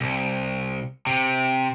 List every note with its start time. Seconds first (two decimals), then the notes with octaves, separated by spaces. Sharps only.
0.01 C2
1.07 C3